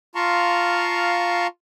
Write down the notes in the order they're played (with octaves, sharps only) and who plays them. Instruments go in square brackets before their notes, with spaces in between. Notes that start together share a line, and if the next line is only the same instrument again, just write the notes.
[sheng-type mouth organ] F4 F5 A5 A#5 C6 C#6